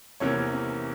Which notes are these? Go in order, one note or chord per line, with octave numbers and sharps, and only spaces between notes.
E2 C3 E3 A#3 C#4 C#5